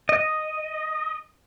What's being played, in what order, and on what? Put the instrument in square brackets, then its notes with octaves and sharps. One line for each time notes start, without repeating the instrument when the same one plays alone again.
[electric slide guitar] D#5